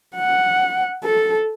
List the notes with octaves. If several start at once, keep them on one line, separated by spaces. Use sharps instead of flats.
F#5
A4